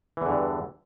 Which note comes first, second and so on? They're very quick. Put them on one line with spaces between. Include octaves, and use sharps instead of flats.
E3 E2 D3 G2